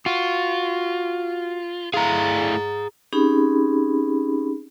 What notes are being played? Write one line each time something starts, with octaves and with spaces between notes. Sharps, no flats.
F4 F#4
A3 E4 G#4 F5 A#5
C4 C#4 D#4 G4 G#4 B5